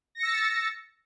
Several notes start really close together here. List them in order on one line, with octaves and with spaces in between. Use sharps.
A#6 C#7 E6 A6